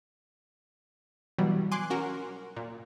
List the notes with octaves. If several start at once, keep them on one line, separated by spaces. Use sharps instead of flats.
B2 E3 F#3 G3
G#5 C6 D6 F#6
C#4 F#4 A#4
A#2